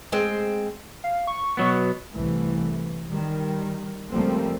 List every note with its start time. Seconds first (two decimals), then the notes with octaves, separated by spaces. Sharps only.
0.12 G#3 C4
1.04 F5
1.27 C#6
1.57 B2 F#3 B3
2.12 C2 E3 A3
3.09 D#3 G3
4.12 C#2 F3 G3 A3 A#3 C4